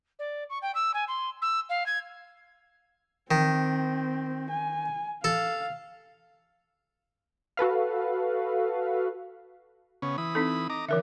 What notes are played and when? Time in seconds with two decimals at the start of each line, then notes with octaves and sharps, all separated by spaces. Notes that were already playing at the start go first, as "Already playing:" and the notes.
0.19 D5
0.50 C#6
0.62 G5
0.75 E6
0.94 G#5
1.08 C6
1.42 E6
1.69 F5
1.86 G#6
3.31 D#3 C4
4.50 G#5
5.24 A4 F5
7.57 F#4 A4 B4 F5
10.02 C#3 B3 C#4
10.18 E3 B5 D#6
10.35 C4 D#4 A4
10.70 D#5 A#5 D6
10.89 D3 E3 A#4 E5